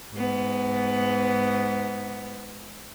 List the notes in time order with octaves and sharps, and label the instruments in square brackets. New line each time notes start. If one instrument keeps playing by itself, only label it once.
[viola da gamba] G#2 B3